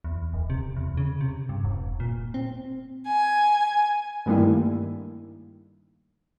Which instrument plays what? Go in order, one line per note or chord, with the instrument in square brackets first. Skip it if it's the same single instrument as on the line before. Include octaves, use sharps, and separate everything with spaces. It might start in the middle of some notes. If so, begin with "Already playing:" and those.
[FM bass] E2
D1
C3
E2
C#3
C3
G2
E1
A#2
C4
[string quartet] G#5
[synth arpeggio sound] G2 D#3 G3 A3 A#3 E4